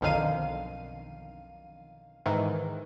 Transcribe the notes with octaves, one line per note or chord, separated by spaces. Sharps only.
B1 F2 D3 D#3 F5 D#7
G#2 D#3 E3